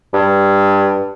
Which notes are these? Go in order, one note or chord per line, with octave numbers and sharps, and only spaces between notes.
G2